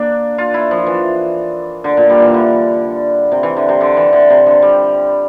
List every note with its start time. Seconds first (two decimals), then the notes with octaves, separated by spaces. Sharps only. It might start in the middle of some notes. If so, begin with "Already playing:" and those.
Already playing: A#3 D4
0.38 F4
0.54 E4
0.71 F3
0.87 E3
1.84 D3
1.97 A#2
2.10 G3
2.21 E3
2.34 D3
3.32 C3
3.43 E3
3.57 D3
3.69 C3
3.81 D3
3.97 E3
4.13 D3
4.30 C3
4.46 D3
4.62 G3